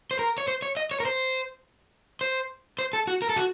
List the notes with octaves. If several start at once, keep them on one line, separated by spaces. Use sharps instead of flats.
C5
A#4
C#5
C5
C#5
D#5
C#5
A#4
C5
C5
C5
A4
F#4
A#4
A4
F#4